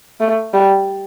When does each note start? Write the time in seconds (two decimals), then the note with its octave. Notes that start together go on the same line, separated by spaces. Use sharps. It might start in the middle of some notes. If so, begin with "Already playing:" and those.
0.20 A3
0.54 G3